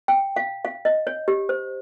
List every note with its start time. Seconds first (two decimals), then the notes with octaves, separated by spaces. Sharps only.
0.08 G5
0.36 F5
0.65 F5
0.85 D#5
1.07 C#5
1.28 G4
1.49 C5